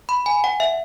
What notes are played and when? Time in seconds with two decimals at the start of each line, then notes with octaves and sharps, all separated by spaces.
0.09 B5
0.26 G#5
0.44 F#5
0.60 E5